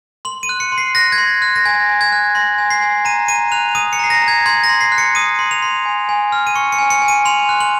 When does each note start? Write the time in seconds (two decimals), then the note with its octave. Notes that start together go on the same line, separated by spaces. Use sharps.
0.25 C6 F#7
0.43 D#7
0.49 F#6
0.60 C#7
0.72 C6
0.78 C7
0.95 F#6 A#6
1.12 G#6
1.18 C6
1.42 F#6
1.56 A#6
1.65 G#5 G#6
1.89 G#5
2.01 G#6
2.12 F#6
2.35 C6 A#6
2.58 G#5
2.70 C7
2.82 G#5
3.05 A#5 D#7
3.28 A#5 D#7
3.52 F#6 F7
3.75 D#6 D#7
3.93 C#7
3.99 A#5 C7
4.10 A#6
4.22 A#5
4.28 G#6
4.46 C6 G#6
4.64 A#6
4.69 C6
4.81 C7
4.92 F#6
4.98 C#7
5.15 D#6 D#7
5.39 C6
5.51 F7
5.62 C6
5.85 G#5
6.09 G#5
6.32 F6
6.47 D#7
6.55 C#6 C#7
6.72 C#7
6.78 G#5
6.90 C#7
7.02 G#5
7.08 D#7
7.25 C6 F7
7.49 F#6
7.60 F#7